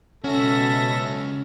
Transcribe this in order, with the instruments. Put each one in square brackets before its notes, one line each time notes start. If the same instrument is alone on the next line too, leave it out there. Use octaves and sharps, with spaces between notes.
[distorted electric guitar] C#2 F#4 [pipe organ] B2 E5 A#6 [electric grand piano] C#4 [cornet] A4